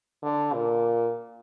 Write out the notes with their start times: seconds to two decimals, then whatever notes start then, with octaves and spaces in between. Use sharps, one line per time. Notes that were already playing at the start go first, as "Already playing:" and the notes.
0.23 D3
0.54 A#2